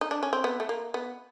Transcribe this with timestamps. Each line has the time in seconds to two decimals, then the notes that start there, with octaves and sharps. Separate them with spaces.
0.01 D#4
0.11 D4
0.23 C#4
0.33 C4
0.44 B3
0.60 A3
0.69 A#3
0.94 B3